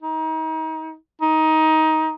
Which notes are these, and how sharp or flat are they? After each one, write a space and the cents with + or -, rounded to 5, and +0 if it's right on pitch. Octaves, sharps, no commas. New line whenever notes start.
D#4 +30
D#4 +20